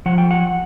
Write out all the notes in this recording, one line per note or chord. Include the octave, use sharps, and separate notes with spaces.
F3 F#5
G5
F#5